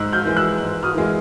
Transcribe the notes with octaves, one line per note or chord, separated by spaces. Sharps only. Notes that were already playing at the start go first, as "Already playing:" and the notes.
Already playing: G#2 E6 F#6
F6 G6
E3 G#3
E6 F#6
G#2
D#6 F6
E3 G#3